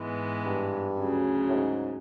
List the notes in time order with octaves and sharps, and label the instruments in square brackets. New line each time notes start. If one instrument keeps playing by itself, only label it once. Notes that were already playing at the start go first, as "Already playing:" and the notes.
Already playing: [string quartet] G#2 E3 G#3 B3
[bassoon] G2
[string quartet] D2 C#3 F#3
[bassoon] A2
G#2